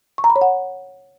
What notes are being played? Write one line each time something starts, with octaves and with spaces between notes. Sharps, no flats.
C#6
A#5
B5
C#5
F#5